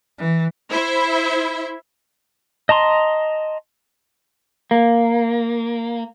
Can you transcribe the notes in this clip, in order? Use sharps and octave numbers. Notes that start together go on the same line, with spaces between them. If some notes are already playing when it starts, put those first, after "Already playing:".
E3
E4 C5 E5
D#5 A5 A#5 C6
A#3